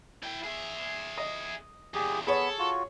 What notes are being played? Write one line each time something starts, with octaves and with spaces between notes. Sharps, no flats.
E4 G5
G#4 E5
D#5
E2 A#2 G4 G#4
B3 G#4 A4 C#5 B5 C#6
F4 F#4